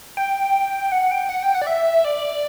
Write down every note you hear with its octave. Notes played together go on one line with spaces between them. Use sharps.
G5
F#5
G5
F#5
G5
F#5
D5
E5
D5